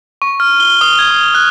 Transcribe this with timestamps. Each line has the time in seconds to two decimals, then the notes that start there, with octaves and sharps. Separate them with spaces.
0.22 C#6
0.40 F6
0.60 G7
0.81 D#6
0.99 G#6
1.11 D#6
1.35 F#6